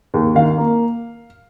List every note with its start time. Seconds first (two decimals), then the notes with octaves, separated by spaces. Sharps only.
0.14 D#2
0.35 D#3 F5
0.58 A#3